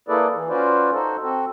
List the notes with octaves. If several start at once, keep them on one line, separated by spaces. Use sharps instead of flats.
A#3 E4 G#4 A4 B4 D5
E3
C#4 F4 F#4 B4 C5 D5
D#4 F#4 A4 C5
C4 F#4 A4